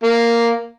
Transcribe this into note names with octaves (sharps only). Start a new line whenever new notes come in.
A#3